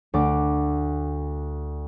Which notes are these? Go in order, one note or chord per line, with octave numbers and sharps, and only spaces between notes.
D2 D5 D6